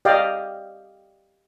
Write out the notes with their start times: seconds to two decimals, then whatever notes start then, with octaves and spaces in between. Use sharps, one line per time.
0.05 G4 D5 D#5 F5 G5